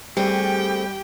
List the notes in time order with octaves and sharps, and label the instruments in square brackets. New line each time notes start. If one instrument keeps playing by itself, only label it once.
[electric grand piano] G3 [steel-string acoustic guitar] A3 C4 G#4 [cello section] G4 [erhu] G5